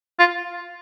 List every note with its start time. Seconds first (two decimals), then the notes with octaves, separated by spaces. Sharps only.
0.19 F4